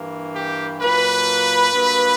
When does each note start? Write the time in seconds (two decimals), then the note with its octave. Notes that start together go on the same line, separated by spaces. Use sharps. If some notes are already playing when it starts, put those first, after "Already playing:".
Already playing: G2 E3 A#3
0.35 G4
0.80 A#2 F#3 A#3 B4
1.71 G2 F#3 A#3